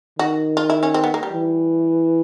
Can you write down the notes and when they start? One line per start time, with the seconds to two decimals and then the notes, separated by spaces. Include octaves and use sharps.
0.19 D#3 F#4
0.57 F4
0.70 E4
0.83 C#4
0.94 C4
1.04 B3
1.14 A#3
1.23 G3
1.33 E3